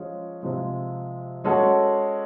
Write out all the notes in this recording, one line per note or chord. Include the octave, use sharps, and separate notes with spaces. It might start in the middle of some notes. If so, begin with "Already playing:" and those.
Already playing: F3 G#3 C#4
C3 F3 G#3
G#3 C#4 F#4 A4 C#5